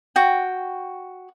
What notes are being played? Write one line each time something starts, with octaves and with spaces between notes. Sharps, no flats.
F#4 G5